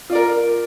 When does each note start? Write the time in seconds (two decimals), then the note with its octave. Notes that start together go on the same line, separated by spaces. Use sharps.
0.10 F4
0.12 D5
0.15 A#4